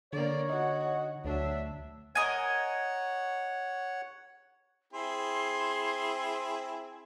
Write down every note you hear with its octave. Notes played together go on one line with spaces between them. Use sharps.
D3 A#3 C#5 D5
D#4 F#4 F#5
D2 F#3 D4 E5
A#4 C#5 D#5 F#5 G#5
C4 E4 G#4 C6